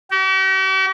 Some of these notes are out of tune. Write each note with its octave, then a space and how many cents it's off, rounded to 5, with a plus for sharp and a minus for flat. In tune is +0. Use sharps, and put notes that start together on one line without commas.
G4 -45